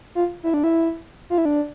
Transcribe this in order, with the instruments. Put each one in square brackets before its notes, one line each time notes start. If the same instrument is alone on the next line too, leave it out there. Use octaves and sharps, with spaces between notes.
[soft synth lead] F4
E4
D4
E4
F4
E4
D4